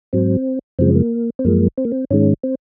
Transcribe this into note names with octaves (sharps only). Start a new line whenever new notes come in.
G#2 F#3 C4
F#2 C#3 F3 G#3 C4
A#3
C4
F#2 F3 G#3 A#3
C4
A#3
C4
G#2 D#3 G#3 C#4
C4